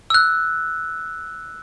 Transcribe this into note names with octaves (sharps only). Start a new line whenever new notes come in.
E6 F#6